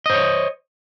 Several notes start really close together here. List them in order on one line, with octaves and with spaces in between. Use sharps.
D#5 C5 C#5